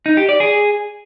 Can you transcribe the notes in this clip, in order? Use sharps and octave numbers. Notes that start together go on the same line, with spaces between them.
D#4
G4
D5
G#4